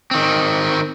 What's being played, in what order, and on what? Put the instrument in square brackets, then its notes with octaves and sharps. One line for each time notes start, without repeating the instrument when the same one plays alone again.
[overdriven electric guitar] D#3 C4